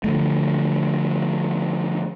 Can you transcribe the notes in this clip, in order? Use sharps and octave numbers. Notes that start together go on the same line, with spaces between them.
D3 F3 A3